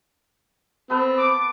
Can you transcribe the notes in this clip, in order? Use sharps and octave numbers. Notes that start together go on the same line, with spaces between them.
B3 C4 A4 B4
D6